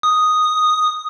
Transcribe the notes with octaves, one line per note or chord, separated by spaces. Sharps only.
D#6